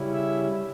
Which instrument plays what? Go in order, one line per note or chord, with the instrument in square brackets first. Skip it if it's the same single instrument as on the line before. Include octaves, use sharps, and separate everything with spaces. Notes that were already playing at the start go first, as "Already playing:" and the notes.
Already playing: [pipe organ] C#3 G3 C#4 E4
E5